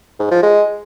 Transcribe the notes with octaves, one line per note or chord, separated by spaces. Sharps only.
G#2
F3
G#3